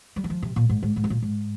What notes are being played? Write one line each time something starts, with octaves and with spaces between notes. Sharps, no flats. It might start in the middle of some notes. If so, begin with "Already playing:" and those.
G3
D#3
F3
C3
A#2
G#2
G#2
G#2
C3
A#2
G#2